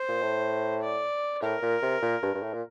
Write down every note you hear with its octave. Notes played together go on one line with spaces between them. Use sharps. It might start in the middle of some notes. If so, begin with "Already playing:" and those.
Already playing: C5
A#2
A2
D5
A2 A#4
A#2
C3
A#2
G2
G2
A2
A#2